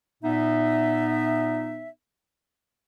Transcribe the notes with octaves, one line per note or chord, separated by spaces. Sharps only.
A#2 B3 D#4 E5